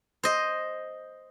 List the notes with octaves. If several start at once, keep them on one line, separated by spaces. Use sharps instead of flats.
C5 D#5